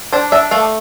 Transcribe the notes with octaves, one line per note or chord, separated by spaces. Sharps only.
D4 C5
D4 E5
A3 F5